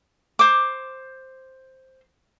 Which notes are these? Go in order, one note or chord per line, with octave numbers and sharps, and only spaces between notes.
C5 D6